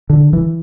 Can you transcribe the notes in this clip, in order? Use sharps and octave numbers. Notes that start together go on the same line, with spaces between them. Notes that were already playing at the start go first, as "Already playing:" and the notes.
D3
E3